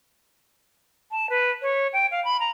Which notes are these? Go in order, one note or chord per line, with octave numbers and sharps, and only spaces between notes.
A5
B4
C#5
G5
F5
B5
A#5